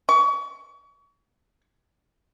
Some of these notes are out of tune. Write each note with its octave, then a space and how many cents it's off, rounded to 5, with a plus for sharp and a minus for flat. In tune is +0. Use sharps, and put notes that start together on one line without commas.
C#6 +35